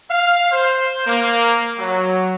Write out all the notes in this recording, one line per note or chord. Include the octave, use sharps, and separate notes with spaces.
F5
C5
A#3
F#3